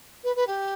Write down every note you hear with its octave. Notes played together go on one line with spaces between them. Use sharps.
B4
B4
G4